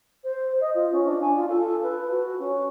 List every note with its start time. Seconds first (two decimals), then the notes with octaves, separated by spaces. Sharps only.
0.23 C5
0.60 D#5
0.74 F4
0.92 C#4
1.05 D4
1.21 G#5
1.36 F4
1.48 A4
1.82 B4
2.10 F#4
2.39 C#4